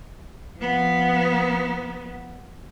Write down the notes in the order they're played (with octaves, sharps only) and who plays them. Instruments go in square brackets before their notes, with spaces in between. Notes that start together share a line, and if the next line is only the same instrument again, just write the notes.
[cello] F3 B3